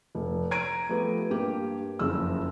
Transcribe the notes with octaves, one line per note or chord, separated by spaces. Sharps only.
F1
A#5 G#6 D7 D#7
F3 A3 B3 G4
G2 A#3 G4
F#1 F2 E6